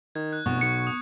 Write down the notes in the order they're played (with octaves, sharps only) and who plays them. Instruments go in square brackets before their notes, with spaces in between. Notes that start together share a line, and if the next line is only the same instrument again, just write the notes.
[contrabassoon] D#3 [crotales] G#6
[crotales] F#6
[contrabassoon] F1 [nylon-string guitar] B2 [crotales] C#6 F#6
[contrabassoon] B1 [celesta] C#7
[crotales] D#6